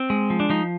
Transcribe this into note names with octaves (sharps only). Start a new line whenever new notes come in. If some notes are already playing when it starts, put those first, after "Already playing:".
Already playing: C4
G#3
F3
D4
F3 D#4